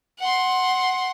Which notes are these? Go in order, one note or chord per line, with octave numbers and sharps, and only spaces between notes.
F#5 C6